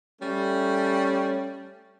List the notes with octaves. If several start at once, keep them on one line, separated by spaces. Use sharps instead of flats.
G3 A3 C#4